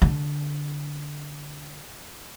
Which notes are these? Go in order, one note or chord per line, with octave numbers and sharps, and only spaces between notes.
D3